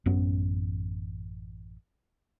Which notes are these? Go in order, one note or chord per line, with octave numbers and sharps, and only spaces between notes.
A1 F#2 B3 C#4